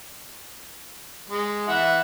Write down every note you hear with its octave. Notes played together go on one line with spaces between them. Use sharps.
G#3
E3 E5 F#5